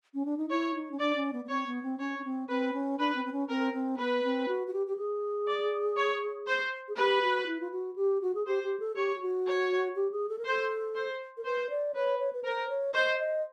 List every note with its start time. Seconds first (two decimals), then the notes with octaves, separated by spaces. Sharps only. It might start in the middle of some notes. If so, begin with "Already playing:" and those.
0.14 C#4
0.25 D4
0.38 D#4
0.50 E4 C#5
0.75 D#4
0.91 C#4
0.99 D4 D5
1.16 C#4
1.33 B3
1.45 B3
1.49 C4 C#5
1.67 B3
1.83 C4
1.99 C#4 C#5
2.19 C#4
2.25 C4
2.49 C4 B4
2.73 C#4
2.99 D4 B4
3.15 C4
3.25 C4
3.32 C#4
3.49 C4 A#4
3.73 C4
3.98 B3 B4
4.23 C4
4.48 F#4
4.67 F#4
4.73 G4
4.87 G4
4.98 G#4
5.47 D5
5.97 C#5
6.47 C5
6.88 G#4
6.97 G4 B4
7.22 F#4
7.47 E4
7.61 F4
7.72 F#4
7.96 G4
8.22 F#4
8.35 G#4
8.46 G4 C5
8.63 G4
8.80 A4
8.96 G4 C#5
9.16 G4
9.21 F#4
9.46 C#5
9.96 G4
10.12 G#4
10.29 A4
10.38 A#4
10.45 A4 C5
10.95 C5
11.37 A#4
11.45 B4 C5
11.70 D5
11.94 B4 C#5
12.19 C#5
12.33 B4
12.44 A#4 C5
12.69 C#5
12.94 C5 D#5
13.20 D#5